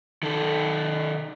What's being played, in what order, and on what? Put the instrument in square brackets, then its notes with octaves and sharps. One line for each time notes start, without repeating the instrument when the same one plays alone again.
[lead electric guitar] D#3 A4